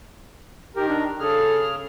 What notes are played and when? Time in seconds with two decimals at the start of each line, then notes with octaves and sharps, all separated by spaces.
0.76 D#3 G4 A#4
0.88 D4
1.19 C#3 G#4 A4 F6